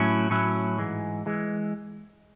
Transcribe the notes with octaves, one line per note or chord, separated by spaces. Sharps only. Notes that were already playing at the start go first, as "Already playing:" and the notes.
Already playing: A2 F#3 C#4 E4
A2 F#3 C#4 E4
G#2 E3 G#3
E3 G#3